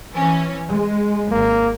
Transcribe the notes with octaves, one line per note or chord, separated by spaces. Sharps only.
E3 C#4
G#3
G#1 A#3